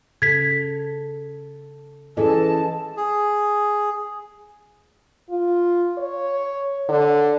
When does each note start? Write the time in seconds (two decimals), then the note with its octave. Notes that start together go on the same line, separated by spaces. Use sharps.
0.22 C#3 A4 G#6 B6
2.17 E3 C#4 G#4 A4 D#5 A5
2.97 G#4
5.30 F4
5.98 C#5
6.89 D3